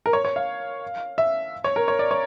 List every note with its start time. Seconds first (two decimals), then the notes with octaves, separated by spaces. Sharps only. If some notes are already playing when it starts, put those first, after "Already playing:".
0.06 A#4
0.13 C#5
0.25 C#5
0.36 F5
1.18 E5
1.64 C#5
1.76 A#4
1.88 C#5
1.99 D5
2.11 C#5